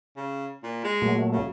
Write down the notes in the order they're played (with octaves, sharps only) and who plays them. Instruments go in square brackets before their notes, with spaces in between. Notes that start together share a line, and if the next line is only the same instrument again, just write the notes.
[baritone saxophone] C#3
A#2
G#3
[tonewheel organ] A#2 F#3 A3
[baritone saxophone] C#3